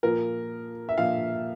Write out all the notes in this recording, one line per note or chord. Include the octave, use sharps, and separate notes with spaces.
A#2 F3 A#4
E5
A#2 F3 F5